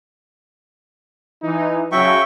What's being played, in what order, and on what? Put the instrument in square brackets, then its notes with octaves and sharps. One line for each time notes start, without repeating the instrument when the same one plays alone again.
[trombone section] E3 D#4
[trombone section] C#3 F#3 [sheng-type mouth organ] E5 G5 C#6